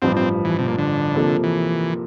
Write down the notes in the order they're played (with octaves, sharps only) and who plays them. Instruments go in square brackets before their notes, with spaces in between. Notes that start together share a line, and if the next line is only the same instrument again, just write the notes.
[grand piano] A1 G2 F3 [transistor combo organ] C4
[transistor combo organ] C4
E3
C3
A#2
D3
[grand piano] C3 F3 A#3 F4 A4
[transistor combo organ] E3